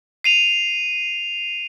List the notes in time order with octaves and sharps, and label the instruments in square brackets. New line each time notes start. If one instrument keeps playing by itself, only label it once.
[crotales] C7 D#7 F7